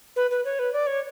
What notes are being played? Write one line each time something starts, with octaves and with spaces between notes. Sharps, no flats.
B4
B4
C#5
B4
D5
C#5